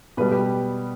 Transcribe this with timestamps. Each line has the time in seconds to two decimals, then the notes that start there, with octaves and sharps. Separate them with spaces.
0.17 B2 G3 B4
0.31 G4